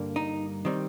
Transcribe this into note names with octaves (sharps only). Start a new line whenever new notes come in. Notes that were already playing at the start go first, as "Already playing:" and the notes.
Already playing: G2 D3 G3 A#3
D#4
D#3 G3 C4